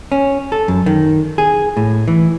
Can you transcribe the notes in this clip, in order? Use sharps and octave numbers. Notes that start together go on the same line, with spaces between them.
C#4
A4
F#2
D#3
G#4
A2
E3